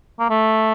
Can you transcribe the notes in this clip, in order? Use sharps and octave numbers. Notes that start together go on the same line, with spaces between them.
A#3
A3